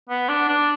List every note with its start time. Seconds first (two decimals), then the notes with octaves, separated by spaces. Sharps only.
0.09 B3
0.29 D4
0.49 D4